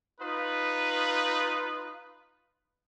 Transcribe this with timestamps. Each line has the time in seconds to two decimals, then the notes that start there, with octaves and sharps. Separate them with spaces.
0.20 D#4 F4 B4